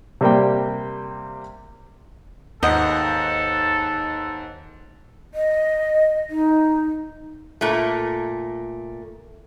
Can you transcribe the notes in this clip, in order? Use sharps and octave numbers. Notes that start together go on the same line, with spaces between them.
C3 G3 A#3 G5
D#2 G#2 A4 D#5 F#5 G6
D#5
D#4
A#2 A3